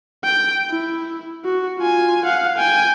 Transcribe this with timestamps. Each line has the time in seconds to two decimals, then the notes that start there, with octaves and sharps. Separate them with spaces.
0.24 G5
0.70 E4
1.45 F#4
1.79 F4 G#5
2.25 F5 F#5
2.57 G5 G#5